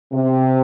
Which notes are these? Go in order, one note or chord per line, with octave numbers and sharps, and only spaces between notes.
C3